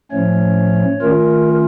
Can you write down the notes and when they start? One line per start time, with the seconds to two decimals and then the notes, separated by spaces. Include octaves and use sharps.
0.11 A2 F3 A3 C#4 C#5
1.01 D#3 A3 C#4 F4 A#4